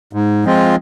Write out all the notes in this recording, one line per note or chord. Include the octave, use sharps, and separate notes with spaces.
G#2
F3 G#3 C4 F4